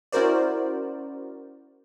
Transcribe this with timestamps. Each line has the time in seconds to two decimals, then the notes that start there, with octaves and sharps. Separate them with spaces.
0.12 C#4 E4 F#4 A#4 C5 D5